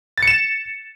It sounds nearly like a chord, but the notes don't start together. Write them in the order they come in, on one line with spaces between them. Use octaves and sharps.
A6 C#7 E7